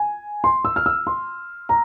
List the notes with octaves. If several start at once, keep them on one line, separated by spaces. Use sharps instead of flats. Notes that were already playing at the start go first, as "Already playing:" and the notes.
Already playing: G#5
C6
E6
F6
E6
C6
A#5